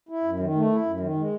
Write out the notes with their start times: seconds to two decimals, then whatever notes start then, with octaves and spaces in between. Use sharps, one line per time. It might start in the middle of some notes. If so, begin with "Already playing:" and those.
0.09 E4
0.24 F#2
0.40 D#3
0.55 A3
0.70 E4
0.85 F#2
1.00 D#3
1.16 G#3